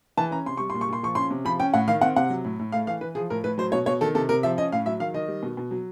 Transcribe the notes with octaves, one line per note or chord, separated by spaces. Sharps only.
E3 A5
C#4 A#5
C3 C6
G3 C#6
A#2 C6
C#6
A#2 C6
F3 C#6
C#4 C6
C3
F3 B5
C#4 G5
A2 F#5
D#3 F5
C4 F#5
C3 F#5
F#3
A2
A2
A3 F5
E3 F5
E3 B4
F3 G#4
A2 A#4
A2 B4
F#3 C5
B2 C#5
B2 C#5
D#3 A4
C3 A4
C3 A#4
F3 E5
C#4 D#5
A2 F5
F#3 E5
D#3 F5
D#3 D#5
G3
B2
B2
F#3